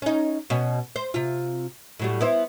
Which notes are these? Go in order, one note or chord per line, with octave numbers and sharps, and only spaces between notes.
C#4 D#4
B2 C#4
C5
C3 F4
A2 F#3 G3
B3 E4 C5